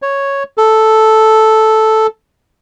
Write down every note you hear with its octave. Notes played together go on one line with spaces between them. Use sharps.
C#5
A4